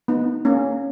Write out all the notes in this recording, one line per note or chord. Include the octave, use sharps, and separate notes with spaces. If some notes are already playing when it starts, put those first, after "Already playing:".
B3 D#4
A#3 C#4